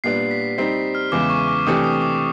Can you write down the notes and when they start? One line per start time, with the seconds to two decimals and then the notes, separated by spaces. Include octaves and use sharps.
0.04 A#2 G3 B3 D4 C7
0.31 B6
0.58 G3 C4 D#4 C7
0.95 F6
1.12 E2 C#3 E3 G#3 D6
1.30 C#6
1.48 D6
1.67 C3 E3 A3 D4 G4 D#6
1.84 D#6
2.02 D6